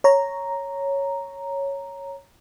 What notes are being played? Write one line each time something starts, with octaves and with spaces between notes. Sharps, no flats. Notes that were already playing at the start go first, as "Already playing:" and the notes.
C#5 A#5